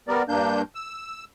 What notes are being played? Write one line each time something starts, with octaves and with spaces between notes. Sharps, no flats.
G3 B3 A#4 D5
G2 A#3 D4 G6
E6